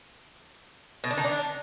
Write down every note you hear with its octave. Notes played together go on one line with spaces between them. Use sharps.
B2
D4
D#3
D4